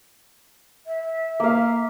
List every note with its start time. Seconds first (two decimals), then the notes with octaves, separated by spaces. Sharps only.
0.87 E5
1.40 A#3 F5